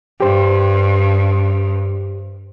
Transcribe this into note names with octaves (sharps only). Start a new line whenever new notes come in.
G2 G4 C5